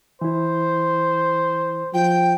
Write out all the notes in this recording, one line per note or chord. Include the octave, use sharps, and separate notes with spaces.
E3 E4 C5
F3 G5